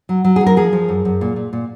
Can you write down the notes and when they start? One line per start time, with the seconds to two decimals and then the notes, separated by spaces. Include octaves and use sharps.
0.09 F#3
0.24 F#3
0.36 F#3 G#4
0.46 A#4
0.57 F3 G#4
0.73 F3
0.89 F#2
1.05 F#2
1.21 A#2
1.36 A#2
1.53 A#2